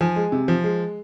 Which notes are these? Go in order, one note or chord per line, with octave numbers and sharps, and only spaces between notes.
F3 G#5
G#3
C3
F3
G#3